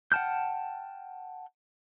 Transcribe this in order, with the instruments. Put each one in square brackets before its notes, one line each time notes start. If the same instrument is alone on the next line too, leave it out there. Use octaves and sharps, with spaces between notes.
[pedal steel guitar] F#5 G5 A5 F6 G6